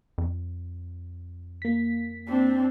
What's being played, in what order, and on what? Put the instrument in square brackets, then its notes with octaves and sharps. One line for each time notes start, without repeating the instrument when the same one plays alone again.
[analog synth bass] F2
[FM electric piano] A#3 B6
[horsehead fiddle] C4 D4